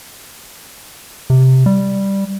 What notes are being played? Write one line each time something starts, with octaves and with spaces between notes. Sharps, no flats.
C3
G3